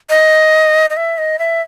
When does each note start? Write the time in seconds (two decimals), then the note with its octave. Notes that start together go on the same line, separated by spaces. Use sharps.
0.10 D#5
0.90 D#5
0.97 E5
1.18 D#5
1.39 E5